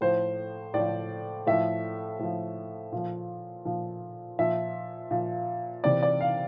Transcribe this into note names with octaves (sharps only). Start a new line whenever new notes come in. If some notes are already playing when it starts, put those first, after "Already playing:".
A2 F3 C5
A2 F3 D5
A2 F3 E5
A2 F3
A#2 F3
A#2 F3
A#2 F3 E5
A#2 F3
C3 E3 D5
D5
F5